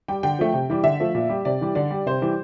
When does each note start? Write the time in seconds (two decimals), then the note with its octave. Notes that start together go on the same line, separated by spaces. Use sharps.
0.08 G3 G5
0.23 D3 G5
0.39 F3 A3
0.54 C3
0.70 E3 G3
0.84 D3 E5
1.00 F3 A3
1.15 A#2
1.29 G3
1.45 C3 D5
1.61 E3 G3
1.75 D3 D5
1.90 G3
2.06 C3 C5
2.22 E3 G3